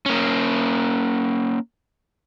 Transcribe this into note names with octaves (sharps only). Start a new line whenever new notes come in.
A#3 C#4